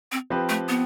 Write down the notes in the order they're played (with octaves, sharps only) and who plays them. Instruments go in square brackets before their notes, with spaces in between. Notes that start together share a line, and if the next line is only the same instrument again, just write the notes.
[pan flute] C4
[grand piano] F3 C4 G4 B4
[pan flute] A3
B3